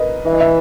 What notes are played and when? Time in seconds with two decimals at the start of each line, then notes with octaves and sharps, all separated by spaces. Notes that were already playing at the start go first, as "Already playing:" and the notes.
Already playing: A#4 B4 D#5
0.26 E3 E5
0.33 D#5
0.40 E5